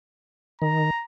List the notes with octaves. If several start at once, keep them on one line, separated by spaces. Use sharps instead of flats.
D#3 A#5